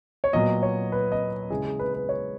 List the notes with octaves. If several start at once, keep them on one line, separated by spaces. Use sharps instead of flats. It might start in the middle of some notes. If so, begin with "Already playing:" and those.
C#5
A#2 F#3 B3 D#5
C#5
B4
D#5
C#3 G#3 C#4 E4 G#4
G#4
B4
B4
C#5